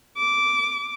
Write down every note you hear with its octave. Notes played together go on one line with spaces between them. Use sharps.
D6